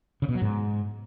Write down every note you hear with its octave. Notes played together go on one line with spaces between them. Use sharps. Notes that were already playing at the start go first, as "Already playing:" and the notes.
C#3
B2
F#3
G#2